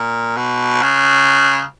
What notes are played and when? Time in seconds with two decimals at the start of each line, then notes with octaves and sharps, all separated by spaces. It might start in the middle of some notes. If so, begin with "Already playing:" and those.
Already playing: A#2
0.37 B2
0.82 C#3